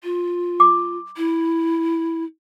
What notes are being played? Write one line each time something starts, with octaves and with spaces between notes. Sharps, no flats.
F4
D6
E4